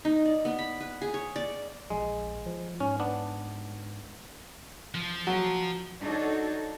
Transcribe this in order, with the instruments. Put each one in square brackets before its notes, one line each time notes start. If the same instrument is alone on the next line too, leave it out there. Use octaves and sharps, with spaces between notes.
[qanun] D#4
D5
B3
B5
B4
G#4
C#5
D5
[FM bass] A#1 [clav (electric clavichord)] G#3
[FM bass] F3
[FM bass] G#2 [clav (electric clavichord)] C#4
[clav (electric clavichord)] B3 D4
[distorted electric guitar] F3
[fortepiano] F#3
[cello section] D4 D#4 F#4 A4 C#5